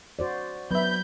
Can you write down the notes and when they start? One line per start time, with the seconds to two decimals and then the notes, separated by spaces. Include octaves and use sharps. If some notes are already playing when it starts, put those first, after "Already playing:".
0.19 F#4 C5 D5
0.71 F#3 B3 E5 B5 G6